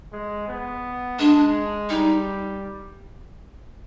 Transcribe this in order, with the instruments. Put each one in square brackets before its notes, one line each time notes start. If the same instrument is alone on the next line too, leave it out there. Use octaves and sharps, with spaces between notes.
[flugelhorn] G#3
B3
[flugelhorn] G#3 [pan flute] D4
[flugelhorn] G3 [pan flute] D#4